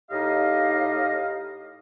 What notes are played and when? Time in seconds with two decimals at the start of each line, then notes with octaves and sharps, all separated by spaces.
0.11 A2 D#4 G4 D#5 F5